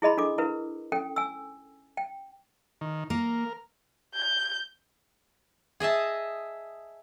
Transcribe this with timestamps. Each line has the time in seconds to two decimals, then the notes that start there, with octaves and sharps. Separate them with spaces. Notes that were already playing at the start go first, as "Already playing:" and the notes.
0.02 E4 G#4 D#5 B5 C6
0.18 D4 A4 D6
0.38 E4 A#4 B4
0.92 C#4 A4 G5
1.16 G#5 E6
1.97 G5
2.81 D#3
3.10 A#3 A#4
4.15 G6
5.80 G#4 D#5 E5 A5